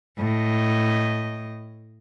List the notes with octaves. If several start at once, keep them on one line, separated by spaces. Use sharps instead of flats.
A2 D#5